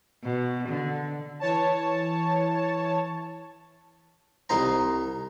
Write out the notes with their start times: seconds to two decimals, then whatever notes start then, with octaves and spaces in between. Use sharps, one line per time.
0.24 B2
0.68 D3
1.40 E3 C#5 A5
4.49 C2 D#4 C5 A#5